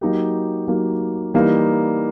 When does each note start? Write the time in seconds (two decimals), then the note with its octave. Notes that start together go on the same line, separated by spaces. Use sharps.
0.01 F#3 A#3 D#4 G4
0.68 F#3 A#3 D#4 G4
1.34 E3 G3 A#3 D#4